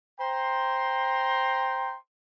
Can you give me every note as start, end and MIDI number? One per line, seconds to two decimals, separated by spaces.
0.20 1.95 72
0.20 1.95 79
0.20 1.95 82
0.20 1.95 84